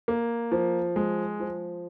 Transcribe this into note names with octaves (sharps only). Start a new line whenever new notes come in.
A#3
F3
G#3
F3